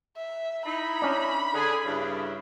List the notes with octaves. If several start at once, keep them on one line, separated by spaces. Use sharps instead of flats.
E5
D#4 E4 B5
C#4 D4
D3 G#4
G2 C#3 E4